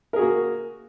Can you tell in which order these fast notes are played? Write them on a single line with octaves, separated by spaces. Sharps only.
A#4 G#4 F#4 A#3